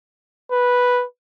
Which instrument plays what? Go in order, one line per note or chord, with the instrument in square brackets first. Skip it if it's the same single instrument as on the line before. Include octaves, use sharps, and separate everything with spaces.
[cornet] B4